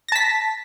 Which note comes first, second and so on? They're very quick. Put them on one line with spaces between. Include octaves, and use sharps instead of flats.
A#6 A5 B6